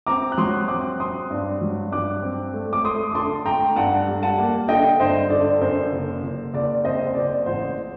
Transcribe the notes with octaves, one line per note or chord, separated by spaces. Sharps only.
C4 A#5 D6
F#6
F#3 C6 D#6
C4 D6 F#6
C4 C6 D#6
G2
F#3
G2 D6 F#6
C4
A3
D6
A3 C6 D#6
D6
D3 A5 C6
A3 G5 A#5
G2 F#5 A5
G3
F#5 A5
A#3
D3 D#5 G5
G2 C5 D#5
D3 D5
F#2 C5
F#1
F#1
F#1 D5
C4 C5 D#5
C5
F#1 D5
A1 C5